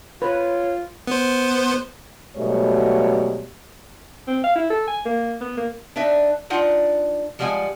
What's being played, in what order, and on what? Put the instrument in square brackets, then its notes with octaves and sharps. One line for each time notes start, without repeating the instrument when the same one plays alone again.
[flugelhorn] F4 [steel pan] B4 [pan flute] C#5
[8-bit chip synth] B3 C5
[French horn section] G#2 B2 F#3 G3 A3 C#5
[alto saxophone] C4
F5
E4
A4
G#5
A#3
B3
A#3
[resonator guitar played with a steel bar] D4 D#4 B4 E5
D4 D#4 F4 F#5
F3 G3 G#3 F#5 G#5